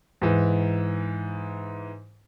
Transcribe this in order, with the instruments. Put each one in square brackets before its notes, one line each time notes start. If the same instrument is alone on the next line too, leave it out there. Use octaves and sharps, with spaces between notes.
[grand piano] G#2 E3